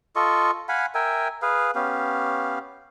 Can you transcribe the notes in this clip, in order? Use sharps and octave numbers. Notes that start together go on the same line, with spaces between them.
F4 A4 D#5 C#6
F5 F#5 G#5 B5
A#4 E5 G5 G#5
G#4 B4 F5
B3 C#4 G4 F5